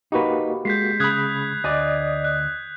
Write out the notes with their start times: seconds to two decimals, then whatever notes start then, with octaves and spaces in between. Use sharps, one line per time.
0.12 A#3 D#4 F#4 G4 B4
0.65 G#3 G6 B6 C7
1.00 C#3 B5 D#6 F#6 G#6
1.64 D2 D5 D#5 G#5
2.25 F#6